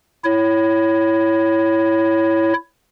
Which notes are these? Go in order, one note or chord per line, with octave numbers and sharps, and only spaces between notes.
E4 C#5